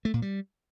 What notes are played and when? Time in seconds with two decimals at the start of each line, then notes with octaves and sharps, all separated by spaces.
0.05 A3
0.14 A#2
0.22 G3